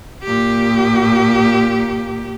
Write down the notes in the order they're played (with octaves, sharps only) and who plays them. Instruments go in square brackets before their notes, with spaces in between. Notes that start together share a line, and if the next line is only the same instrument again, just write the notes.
[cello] A#2 G4